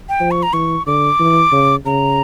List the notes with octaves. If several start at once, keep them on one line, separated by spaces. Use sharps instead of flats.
G5
F3
C#6
A#5
E3 C#6
D3 D6
E3
C#3
C#3 A#5